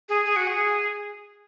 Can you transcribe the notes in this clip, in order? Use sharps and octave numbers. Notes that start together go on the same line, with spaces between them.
G#4
G#4
F#4
G#4